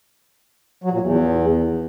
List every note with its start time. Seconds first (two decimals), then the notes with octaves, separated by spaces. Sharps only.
0.84 F#3
0.92 A#2
1.00 E2